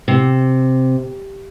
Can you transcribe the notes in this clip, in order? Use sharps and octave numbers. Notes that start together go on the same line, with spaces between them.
C3